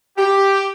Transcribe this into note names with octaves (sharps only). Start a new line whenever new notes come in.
G4